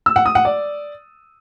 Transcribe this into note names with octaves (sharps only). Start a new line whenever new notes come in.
E6
F#5
D#6
F#5
D5